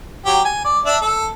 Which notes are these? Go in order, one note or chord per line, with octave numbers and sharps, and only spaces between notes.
F#3 G4
G#5
D5
D4 E5
A4